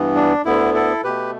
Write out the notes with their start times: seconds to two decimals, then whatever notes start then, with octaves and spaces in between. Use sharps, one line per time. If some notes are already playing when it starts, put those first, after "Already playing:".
Already playing: G2 E3 B3
0.15 D4
0.45 D2 D3 B3 E4
0.74 E4 A4
1.04 B2 A3 G4 B4